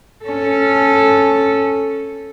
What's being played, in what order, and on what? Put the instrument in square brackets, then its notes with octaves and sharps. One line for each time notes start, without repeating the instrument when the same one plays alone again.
[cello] C#4 A4